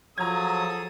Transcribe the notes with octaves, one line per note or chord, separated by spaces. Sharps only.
F3 F#3 G#4 A4 A#5 D#6 G#6